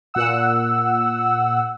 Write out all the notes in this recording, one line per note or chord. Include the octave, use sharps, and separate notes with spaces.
A#2 F#5 E6